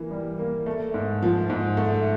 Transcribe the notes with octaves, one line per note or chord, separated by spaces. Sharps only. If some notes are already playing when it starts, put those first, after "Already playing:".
Already playing: E3 A#3
G3
A#3
A3
G#2
F3
G#2
A3